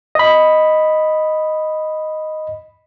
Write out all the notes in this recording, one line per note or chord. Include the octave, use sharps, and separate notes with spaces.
D#5 B5